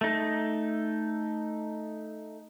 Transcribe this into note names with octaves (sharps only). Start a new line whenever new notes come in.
A3 D#4